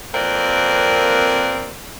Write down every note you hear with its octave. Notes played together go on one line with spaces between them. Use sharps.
F2 A#3 C4 A#4 B4 D5